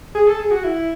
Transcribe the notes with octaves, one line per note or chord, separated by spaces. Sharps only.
G#4
A4
G#4
F#4
E4